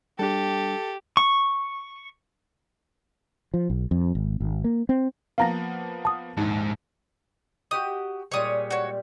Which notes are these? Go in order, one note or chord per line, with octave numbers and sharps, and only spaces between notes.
G3 D4 G4 A4
C#6
F3
B1
F2
G#1
G#1
A#3
C4
F3 A#3 B3 F5 A#5 A#6
A5 D#6
A#1 D#2 G#2
F#4 G4 D#5 D#6
A#2 G3 G#3 C#5 D#6
F#4 C#5